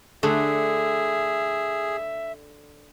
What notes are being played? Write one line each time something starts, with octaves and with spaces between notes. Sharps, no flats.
D3 A3 G#4 E5